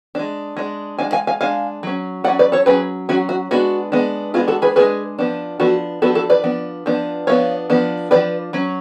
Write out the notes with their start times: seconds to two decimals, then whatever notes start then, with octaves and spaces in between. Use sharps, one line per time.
0.15 G#3 D4
0.57 G#3 D4
0.98 G#3 D4 F5 G#5
1.12 F5 G#5
1.27 F5 G#5
1.41 G#3 D4 F5 G#5
1.83 F#3 C#4
2.24 F#3 D5 F#5
2.28 C#4
2.39 B4 D5
2.52 A4 C#5
2.66 F#3 C#4 G#4 B4
3.09 F#3 C#4 F#4
3.29 F#4
3.51 G#3 B3 D4 F#4
3.92 G#3 B3 D4
4.34 G#3 B3 D4 F4 G#4
4.48 F#4 A4
4.62 G#4 B4
4.76 G#3 B3 D4 G#4 B4
5.19 F3 B3 D4
5.60 F3 B3 D4 F#4 A4
6.02 F3 B3 D4 F#4 A4
6.15 F#4 A4
6.30 B4 D5
6.44 F3 B3 D4
6.86 F3 B3 D4
7.27 F3 B3 D4 C#5 F5
7.70 F3 B3 D4
8.11 F3 B3 D4 B4 D5
8.53 F#3 C#4